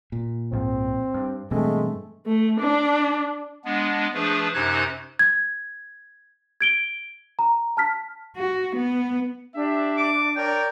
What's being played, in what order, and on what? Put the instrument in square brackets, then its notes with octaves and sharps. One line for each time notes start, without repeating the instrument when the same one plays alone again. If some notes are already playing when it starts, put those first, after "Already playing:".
[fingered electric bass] A#2
[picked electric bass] C2 G#2 F3 [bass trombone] C4
[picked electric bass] G2
[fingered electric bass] G2 [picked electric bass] B2 E3 C4 [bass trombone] G#3 [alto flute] A3
[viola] A3
D4
[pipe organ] G#3 B3 D4
F3 A3 D4 G#4 B4
F#2 C3 D#4 C5 F#6 G#6
[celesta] G#6
G#6 D7 G7
A#5
A5 F6 B6
[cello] F#4
B3
[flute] D4 [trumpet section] G4 E5
[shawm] D6
[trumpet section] A#4 C#5 D5 [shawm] G5